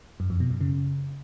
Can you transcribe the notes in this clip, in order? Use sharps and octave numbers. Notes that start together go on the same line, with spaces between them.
F#2
F2
B2
F#2
C#3